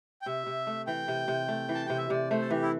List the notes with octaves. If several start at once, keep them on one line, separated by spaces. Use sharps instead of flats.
G5
C3 E5
C3
A3
E3 G5
C3
C3
A3
E3
A5
C3 G5
E5
C3 D5
A3 C5
A4
E3 G4
E4